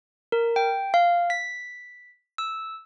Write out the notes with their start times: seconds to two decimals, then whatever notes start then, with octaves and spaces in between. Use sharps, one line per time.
0.32 A#4
0.56 G5
0.94 F5
1.30 B6
2.38 E6